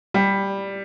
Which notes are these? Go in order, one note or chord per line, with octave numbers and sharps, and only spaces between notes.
G3